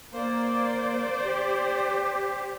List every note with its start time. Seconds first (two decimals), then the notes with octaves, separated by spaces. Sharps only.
0.13 A#3 C5 D5
1.25 G4